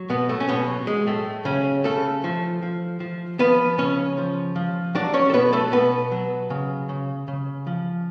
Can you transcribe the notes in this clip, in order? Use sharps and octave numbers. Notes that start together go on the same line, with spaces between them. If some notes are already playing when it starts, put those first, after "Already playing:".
Already playing: F#3
B2 B3
A2 A3
C#4
B2 B3
F#3
G#3
A2 A3
C#3 F#3 C#4
C#3 A3 A4
F3
F3
F3
F3 B3 B4
C#3 C#4 C#5
F3
F3
F#3 D4 D5
C#4 C#5
A4
B2 B3 B4
A3 A4
B2 B3 B4
F#3
C#3
C#3
C#3
F3